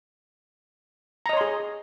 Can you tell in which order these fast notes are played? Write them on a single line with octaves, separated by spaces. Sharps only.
A#5 D#5 C#5 C6 G#4